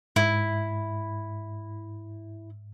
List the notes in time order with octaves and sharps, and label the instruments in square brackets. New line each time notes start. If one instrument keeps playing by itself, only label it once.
[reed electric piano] G#2 [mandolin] E4